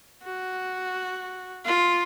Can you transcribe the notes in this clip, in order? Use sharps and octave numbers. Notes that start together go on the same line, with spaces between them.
F#4
F4